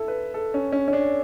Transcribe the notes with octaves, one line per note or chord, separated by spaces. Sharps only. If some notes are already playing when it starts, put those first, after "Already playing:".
Already playing: E4 A4
B4
A4
C#4
C#4
C#4
D4